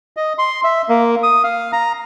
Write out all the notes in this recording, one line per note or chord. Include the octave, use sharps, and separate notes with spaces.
D#5
C6
E5
A#3
D#6
F5
A#5